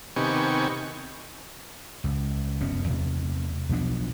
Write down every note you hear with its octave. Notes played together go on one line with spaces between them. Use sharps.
C3 D#3 B3 G4 G#5 C#6
C#2
F1 F#2 B3 C#4
E2 C3 A3
B1 F3 B3 D4